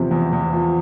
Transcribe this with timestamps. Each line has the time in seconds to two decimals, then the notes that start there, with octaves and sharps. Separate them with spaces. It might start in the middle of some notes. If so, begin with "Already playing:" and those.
Already playing: E2 C3 F3
0.11 E2
0.33 E2
0.53 F3